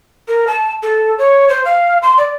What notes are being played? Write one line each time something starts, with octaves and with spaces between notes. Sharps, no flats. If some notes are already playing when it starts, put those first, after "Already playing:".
A#4
A5
A4
C#5
C5
F5
C6
D5